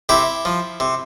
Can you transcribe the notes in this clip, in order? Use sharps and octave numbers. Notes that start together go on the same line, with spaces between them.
C3 E4 G4
F3
C3